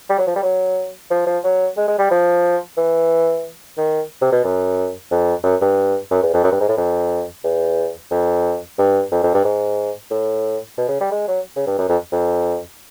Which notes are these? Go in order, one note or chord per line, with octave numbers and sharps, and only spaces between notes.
G3
F#3
F3
G3
F#3
F3
F3
F#3
G#3
G#3
G3
F3
E3
D#3
C3
B2
F#2
F2
F#2
G2
F#2
E2
F2
F#2
G2
G#2
A2
F2
E2
F2
G2
F2
F2
G2
G#2
A2
B2
C#3
G3
G#3
F#3
C#3
G2
F#2
F2
F2